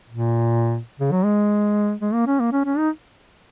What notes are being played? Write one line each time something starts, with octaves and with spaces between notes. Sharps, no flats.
A#2
C#3
F#3
G#3
G#3
A#3
C#4
A#3
C#4
C#4
D#4